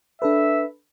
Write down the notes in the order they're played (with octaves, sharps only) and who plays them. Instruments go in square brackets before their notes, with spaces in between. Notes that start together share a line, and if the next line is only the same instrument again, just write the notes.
[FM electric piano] D4 A4 B4 [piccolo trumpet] E5